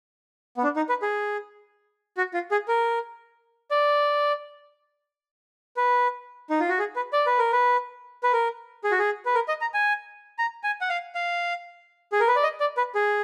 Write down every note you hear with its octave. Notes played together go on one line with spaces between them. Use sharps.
B3
D4
D#4
B4
G#4
F#4
F4
G#4
A#4
D5
B4
D#4
F4
F#4
G#4
B4
D5
B4
A#4
B4
B4
A#4
G#4
F#4
G#4
B4
A#4
D#5
A#5
G#5
A#5
G#5
F#5
F5
F5
G#4
A#4
B4
D5
D#5
D5
B4
G#4